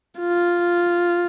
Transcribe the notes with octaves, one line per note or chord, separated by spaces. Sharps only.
F4